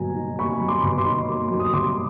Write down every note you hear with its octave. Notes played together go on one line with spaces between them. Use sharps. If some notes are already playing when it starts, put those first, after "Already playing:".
Already playing: B2 F#3 A#3 G#5 A#5
D#4
A#3 B5 C#6
F#3
C6 D6
B2
C6 D6
D#4
A#3
F#3
D#6
B2 C6 D6